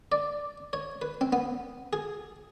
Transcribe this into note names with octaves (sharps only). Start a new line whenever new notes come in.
D5
C#5
B4
C4
B3
G#4